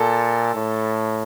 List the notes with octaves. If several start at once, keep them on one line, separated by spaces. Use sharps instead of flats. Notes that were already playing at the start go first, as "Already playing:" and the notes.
Already playing: A#2 A4
A2